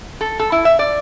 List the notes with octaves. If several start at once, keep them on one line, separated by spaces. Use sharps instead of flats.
A4
A4
E4
E5
D5